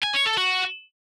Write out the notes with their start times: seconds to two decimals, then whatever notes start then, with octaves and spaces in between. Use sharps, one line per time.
0.02 G#5
0.14 C#5
0.26 A4
0.37 F#4